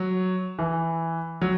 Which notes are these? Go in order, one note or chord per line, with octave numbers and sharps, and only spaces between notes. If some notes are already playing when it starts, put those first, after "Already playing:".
Already playing: F#3
E3
F#3